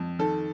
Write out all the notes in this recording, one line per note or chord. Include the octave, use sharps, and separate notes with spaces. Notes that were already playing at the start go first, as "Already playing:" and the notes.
Already playing: F2
D#3 A4